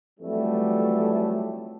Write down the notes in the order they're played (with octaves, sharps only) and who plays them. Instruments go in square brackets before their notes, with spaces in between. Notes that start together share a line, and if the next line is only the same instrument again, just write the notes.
[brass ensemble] F2 E3 F#3 G3 A3